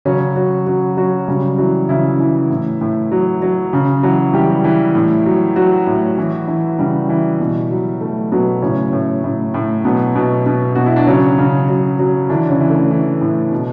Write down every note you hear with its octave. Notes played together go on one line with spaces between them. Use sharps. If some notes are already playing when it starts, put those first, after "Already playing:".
C#3 F#3 C#4
F#3 F#4
F#3 F#4
F#3 F#4
C#3 G3 G4
E3 F#3 F#4
C#3 E3 E4
E3
A2
A2
F#3
F#3
C#3
E3 F#3 F#4
E3 G3 G4
E3
A2
F#3
F#3 F#4
A2
E3
E3
C#3 G3
E3
B2
F#3
F#3 A3
B2 F#3 B3
A2 C#3 C#4
A2
A2
A2
B2 F#3 B3
B2
B2
B2 F#4
E4
D4
C#3 F#3 C#4
C#3
F#3
F#3
D3 E3 D4
C#3 C#4
E3
A3
E3
A2
B2